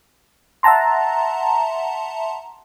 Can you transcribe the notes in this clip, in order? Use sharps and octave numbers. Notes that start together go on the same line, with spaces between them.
E5 F#5 A5 A#5 C6